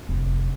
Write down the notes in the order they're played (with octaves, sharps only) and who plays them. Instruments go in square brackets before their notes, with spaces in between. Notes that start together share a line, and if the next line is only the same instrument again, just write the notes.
[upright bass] F1